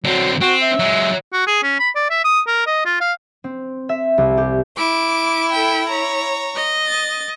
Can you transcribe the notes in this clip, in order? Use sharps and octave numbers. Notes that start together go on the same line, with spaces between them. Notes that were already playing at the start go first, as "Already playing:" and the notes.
D3 F#3 C4
C4 F#4
E5
F#3 G#3
F#4
G#4
C#4
B5
D5
E5
D#6
A#4
D#5
F4
F5
C4
E5
C2
G4
E4 D6
A4 G5
C#5 A#5
D#5
A6